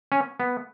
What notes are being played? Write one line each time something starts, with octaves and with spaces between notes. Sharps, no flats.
C#4
B3